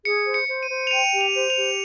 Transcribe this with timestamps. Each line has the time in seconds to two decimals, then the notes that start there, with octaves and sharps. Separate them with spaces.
0.05 G#4 C#7
0.26 C5
0.34 C#7
0.48 C5
0.63 D#7
0.70 C5
0.87 F7
0.91 G5 D#7
1.13 G4
1.21 F7
1.35 C5
1.50 F7
1.57 G4